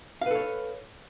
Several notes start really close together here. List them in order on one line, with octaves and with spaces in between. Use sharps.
F5 B4 A4 C#5